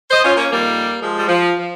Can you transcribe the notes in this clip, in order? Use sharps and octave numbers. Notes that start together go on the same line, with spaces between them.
C5 D#5
C#4 F4
A#3 C#4
F2 D#3 G3 A#3
F3 G#3
G3
F3
F3